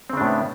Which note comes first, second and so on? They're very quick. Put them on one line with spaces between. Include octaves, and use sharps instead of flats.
C4 C#3 D4 A2 B3